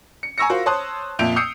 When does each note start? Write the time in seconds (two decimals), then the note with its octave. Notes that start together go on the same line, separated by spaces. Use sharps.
0.23 C#7
0.38 G#5 A#5 C#6 E6 A#6 C#7
0.50 F4 F#4 A#4 C5
0.66 C5 C#5 A5 C6 D#6 F#6
1.19 F2 A#2 E5 G6 D7 F7
1.36 D#6 E6 G6 C7 C#7